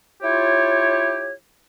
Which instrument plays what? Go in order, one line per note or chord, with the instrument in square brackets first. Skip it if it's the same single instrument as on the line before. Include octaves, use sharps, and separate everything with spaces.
[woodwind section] E4 F4 G4 C#5